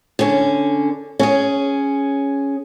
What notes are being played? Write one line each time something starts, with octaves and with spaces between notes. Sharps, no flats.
D3 C#4
C#4 G#4